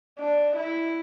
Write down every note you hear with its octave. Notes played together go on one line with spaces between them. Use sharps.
D4
E4